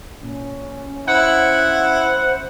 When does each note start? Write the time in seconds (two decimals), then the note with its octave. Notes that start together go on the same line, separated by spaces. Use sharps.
0.23 A#2 C#4
1.07 E4 C5 F#5